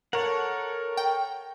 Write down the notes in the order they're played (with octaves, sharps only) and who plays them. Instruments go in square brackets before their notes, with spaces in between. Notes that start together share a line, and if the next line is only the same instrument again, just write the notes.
[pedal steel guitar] A4 C#5 F#5 [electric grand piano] A#4
[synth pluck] G5